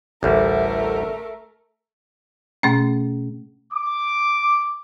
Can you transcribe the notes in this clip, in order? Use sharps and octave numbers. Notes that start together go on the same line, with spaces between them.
A1 D2 G3 A3 A#4
B2 A3 C#4
D6